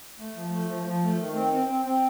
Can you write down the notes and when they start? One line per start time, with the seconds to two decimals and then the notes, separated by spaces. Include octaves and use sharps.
0.19 A3
0.36 F3
0.53 A3
0.69 F3
0.86 F3
1.03 A3
1.19 D#3
1.35 C4
1.53 C4
1.68 C4
1.85 C4